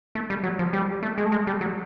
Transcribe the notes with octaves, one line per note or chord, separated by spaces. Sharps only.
A3
G3
F#3
F3
G3
A3
G#3
A3
G#3
G3
F#3